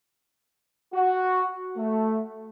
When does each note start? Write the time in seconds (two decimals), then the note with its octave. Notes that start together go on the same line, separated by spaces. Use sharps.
0.94 F#4
1.77 A3